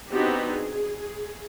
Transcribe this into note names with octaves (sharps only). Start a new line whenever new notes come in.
B3 C4 D4 D#4 F#4 G4
G#4